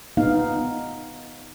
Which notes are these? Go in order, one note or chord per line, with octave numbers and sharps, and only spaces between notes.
B3 D#4 F5